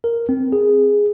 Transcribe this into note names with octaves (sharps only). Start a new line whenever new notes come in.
A#4
C4
G#4